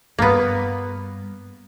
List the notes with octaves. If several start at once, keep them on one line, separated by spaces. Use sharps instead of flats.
G2 G3 A#3 B3